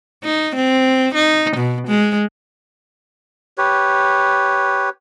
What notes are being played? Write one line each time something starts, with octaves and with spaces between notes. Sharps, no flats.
D#4
C4
D#4
B2
G#3
G4 B4 C#5